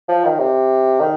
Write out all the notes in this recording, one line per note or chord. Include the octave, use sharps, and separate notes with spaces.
F3
D#3
C3
D#3